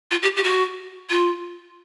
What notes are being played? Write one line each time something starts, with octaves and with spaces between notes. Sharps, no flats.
F4
G4
G4
F#4
F4